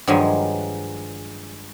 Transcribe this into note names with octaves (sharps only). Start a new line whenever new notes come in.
G2 D#3 F3 F#3 G#3 G#5